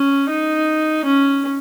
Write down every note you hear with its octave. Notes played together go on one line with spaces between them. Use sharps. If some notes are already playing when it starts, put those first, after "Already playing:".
Already playing: C#4
D#4
C#4